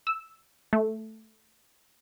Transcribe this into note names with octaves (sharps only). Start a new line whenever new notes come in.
E6
A3